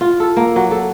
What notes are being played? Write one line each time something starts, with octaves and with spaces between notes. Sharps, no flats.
F4
A4
A#3
F#3
A4